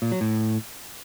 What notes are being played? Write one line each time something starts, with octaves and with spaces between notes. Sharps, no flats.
A#2
F#3
A2